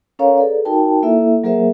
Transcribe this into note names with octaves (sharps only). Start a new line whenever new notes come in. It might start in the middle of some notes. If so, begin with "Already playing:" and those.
C#4 A4 A#4 C#5 F5 A#5
G#4 A4 B4 D5
D#4 F#4 A#4 G5 A5
A#3 E4 A4 E5
F#3 A#3 G#4 A#4 C5 E5